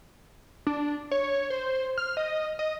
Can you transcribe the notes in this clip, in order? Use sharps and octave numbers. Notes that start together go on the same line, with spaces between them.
D4
C#5
C5
F6
D#5
D#5